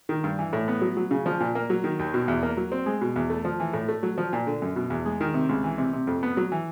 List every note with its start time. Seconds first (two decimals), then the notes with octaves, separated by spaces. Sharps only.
0.09 D#3
0.24 G2
0.39 E3
0.53 A2
0.68 B3
0.81 F#3
0.97 F#3
1.11 C#3
1.26 F3
1.40 A#2
1.55 A#3
1.70 F#3
1.84 D#3
1.99 D#2
2.14 B2
2.28 E2
2.43 A#3
2.57 F#3
2.72 C4
2.86 G#3
3.01 B2
3.16 E2
3.30 A3
3.45 F3
3.60 E3
3.73 A2
3.88 A3
4.03 F#3
4.18 F3
4.33 A#2
4.47 D3
4.62 F#2
4.76 B2
4.90 E2
5.06 G#3
5.21 D#3
5.34 C3
5.49 C#2
5.64 E3
5.78 C3
5.93 C3
6.07 F2
6.23 B3
6.37 F#3
6.52 E3